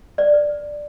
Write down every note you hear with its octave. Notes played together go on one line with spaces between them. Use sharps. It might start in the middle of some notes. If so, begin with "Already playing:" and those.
B4 D5
B4